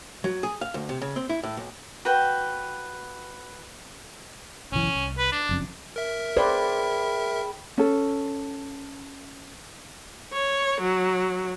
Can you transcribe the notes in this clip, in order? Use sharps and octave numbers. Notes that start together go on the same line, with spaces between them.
F#3
G#4
F5
D2
C3
C#3
C4
E4
A2
B1
F#4 B4 G5
F#1 B1 E3 C#4
C2
B4
D4
F#1 F2 C#4
A#4 E5
G#4 B4 C5 D5 G5 B5
C#4 A4
C#5
F#3